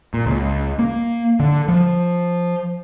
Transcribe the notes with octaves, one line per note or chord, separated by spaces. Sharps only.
A#2
C#2
A#3
D3
F3